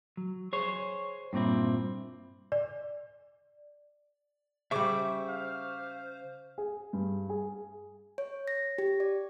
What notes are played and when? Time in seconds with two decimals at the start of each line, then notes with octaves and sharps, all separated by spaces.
0.17 F#3
0.53 G#4 C5 C#5
1.33 G2 A#2 C4 E4
2.52 D5
4.71 C#3 G3 C5 E5 C#6 D6
5.29 F5
6.58 G#4
6.93 G2
7.30 G#4
8.18 C#5
8.48 A#6
8.78 G4
9.00 D5